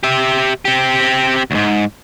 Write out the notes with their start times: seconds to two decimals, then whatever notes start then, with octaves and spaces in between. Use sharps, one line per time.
0.03 G4 E5
0.65 C4 G4
1.51 D2 G#2